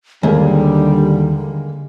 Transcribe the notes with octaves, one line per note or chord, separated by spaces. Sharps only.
D#2 D3 G3 G#3 A#3